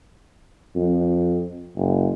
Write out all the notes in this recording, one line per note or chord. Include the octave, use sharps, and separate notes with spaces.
F2
F#1